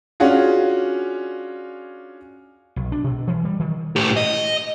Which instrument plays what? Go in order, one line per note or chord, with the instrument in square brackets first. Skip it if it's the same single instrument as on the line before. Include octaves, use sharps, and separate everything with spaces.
[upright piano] C#4 D4 F4 F#4 G#4
[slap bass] B1
D4
B2
E3
G3
D#3
[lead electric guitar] A2 G4
D#5